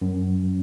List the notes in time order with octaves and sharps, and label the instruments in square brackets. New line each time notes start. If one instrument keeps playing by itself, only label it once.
[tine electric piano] F#2